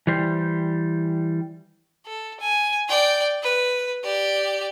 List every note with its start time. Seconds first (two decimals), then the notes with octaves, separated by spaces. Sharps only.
0.07 E3 G3 C5
2.06 A4
2.40 G#5
2.89 D5 G5
3.43 B4
4.03 G4 D5